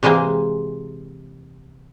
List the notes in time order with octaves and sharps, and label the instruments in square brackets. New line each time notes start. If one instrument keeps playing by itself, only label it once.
[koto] C3 E3 G#3 A#3 C4